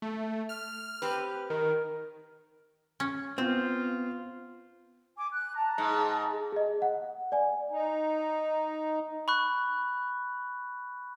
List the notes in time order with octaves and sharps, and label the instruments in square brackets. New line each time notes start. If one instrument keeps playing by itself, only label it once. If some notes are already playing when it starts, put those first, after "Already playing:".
[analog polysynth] A3
F6
[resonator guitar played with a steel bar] C4 G4 B4
[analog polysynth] D#3 [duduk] A#4
[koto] C#4
[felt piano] B3 [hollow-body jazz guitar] C4 [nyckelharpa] F4
[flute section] G#5 D6
F#6
A5 A#5
[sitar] G#2
[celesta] G#4 D#5
F#5
D5 G#5
[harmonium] D#4
[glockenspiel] B5 C#6 F#6